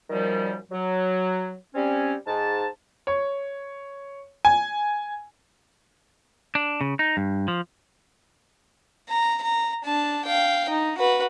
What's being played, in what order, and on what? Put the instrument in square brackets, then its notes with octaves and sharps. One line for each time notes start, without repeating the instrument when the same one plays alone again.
[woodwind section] F#2 A#2 D#3 F3 G3
F#3
G3 C4 C#4
G#2 A5
[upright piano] C#5
G#5
[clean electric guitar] D4
C#3
D#4
G2
F3
[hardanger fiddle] A#5
A#5
D4 A5
F5 G5
D#4
F#4 B4